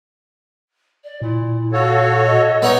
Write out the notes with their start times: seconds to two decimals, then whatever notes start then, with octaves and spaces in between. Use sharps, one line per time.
1.04 D5
1.22 A#2 E4
1.72 F#4 A4 C#5 F5
2.26 D#5
2.62 G#3 B3 D#4 C#5 F#5